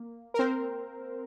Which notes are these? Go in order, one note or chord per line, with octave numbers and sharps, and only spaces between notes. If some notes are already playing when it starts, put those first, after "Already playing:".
Already playing: A#3
A#4
C4 C5